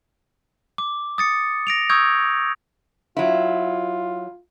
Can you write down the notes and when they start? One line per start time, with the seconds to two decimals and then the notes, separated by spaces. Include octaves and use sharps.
0.78 D6
1.18 D#6 A6 C#7
1.67 A#6 D7 F7
1.89 C#6 D#6 E6 G6 G#6
3.17 F#3 E4 F4